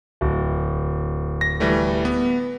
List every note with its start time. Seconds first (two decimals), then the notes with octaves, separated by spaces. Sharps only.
0.21 D1
1.41 A#6
1.60 E3 G3 A3
2.05 B3